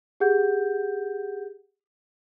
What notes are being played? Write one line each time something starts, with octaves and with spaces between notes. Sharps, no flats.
G4 G#4 F#5 G6